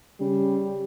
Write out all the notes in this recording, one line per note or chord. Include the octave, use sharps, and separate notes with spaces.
C#3 G3